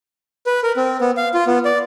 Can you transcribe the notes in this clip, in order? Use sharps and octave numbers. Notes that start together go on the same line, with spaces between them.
B4
A#4
C4
B3
F5
F4
B3
D5